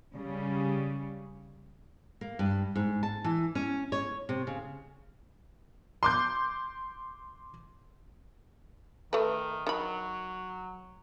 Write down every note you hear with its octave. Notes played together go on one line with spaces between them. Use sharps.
C#3 G3
A#3
G2
G#2
A5
E3
C#4
C#5
C3
C#3
C6 D6 G6
D#3 A3 B4
D#3 F#3 B5